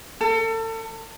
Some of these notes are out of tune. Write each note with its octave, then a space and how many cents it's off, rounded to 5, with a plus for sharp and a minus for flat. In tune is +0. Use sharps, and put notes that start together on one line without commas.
A4 +35